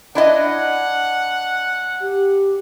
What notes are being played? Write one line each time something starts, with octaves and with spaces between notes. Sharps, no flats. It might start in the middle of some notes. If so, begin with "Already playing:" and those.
D4 E4 D#5 F#5
G4